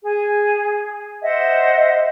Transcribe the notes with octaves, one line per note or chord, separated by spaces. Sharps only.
G#4
C5 D#5 E5 F#5